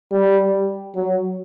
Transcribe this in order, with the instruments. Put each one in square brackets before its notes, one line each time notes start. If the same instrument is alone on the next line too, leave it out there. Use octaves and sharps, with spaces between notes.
[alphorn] G3
F#3